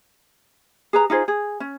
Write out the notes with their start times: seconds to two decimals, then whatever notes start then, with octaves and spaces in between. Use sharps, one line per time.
0.93 G#4 B4 A#5
1.10 D#4 F4 G#4 C5
1.28 G#4
1.60 C#4